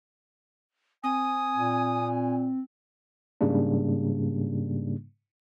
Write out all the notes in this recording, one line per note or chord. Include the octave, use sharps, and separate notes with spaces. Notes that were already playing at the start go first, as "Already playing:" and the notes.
C4 G#5 D#6
A#2
G#2 C#3 G3 A#3 D4